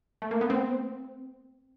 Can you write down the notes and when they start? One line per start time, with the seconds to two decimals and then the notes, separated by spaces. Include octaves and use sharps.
0.22 A3
0.31 A#3
0.41 B3
0.50 C4